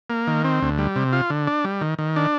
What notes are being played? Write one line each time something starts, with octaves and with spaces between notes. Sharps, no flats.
A#3
D#3
C4
D2
G3
C3
F4
D3
D4
G3
D#3
D#3
D4